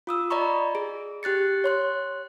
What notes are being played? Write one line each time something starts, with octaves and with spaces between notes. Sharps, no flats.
F4 D#6 E6
D5 D#5 A#5 B5 C#6
G#4
G4 F#6 A6 C#7
C#5 C6 F#6